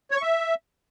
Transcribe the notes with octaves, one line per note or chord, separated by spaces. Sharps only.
C#5
C#6
E5